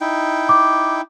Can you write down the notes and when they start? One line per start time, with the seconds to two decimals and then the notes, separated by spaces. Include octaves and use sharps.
0.01 D#4 E4 G5
0.49 D6